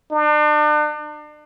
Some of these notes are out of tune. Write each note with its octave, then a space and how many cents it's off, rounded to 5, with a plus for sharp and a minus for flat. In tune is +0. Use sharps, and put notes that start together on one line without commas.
D4 +40